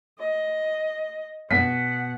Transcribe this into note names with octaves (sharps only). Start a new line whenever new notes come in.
D#5
B2 B3 F#5 B6